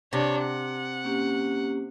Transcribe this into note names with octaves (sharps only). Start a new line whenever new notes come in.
C3 D4 C#5
F#5
A#3 C#4 G4